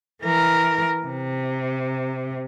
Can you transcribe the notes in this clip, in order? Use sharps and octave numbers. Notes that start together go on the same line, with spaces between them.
E3 A#4
C3